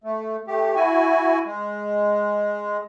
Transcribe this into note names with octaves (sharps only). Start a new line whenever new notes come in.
A3
A3 G4
E4 F#4 G#5
G#3